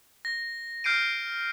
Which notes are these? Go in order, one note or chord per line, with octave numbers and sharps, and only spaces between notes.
A#6
F6 G6 C7 D7 D#7